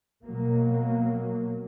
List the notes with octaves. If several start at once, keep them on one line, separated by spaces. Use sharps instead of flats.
B2 F#3 A#3